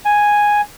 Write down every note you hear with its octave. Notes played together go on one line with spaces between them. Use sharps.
G#5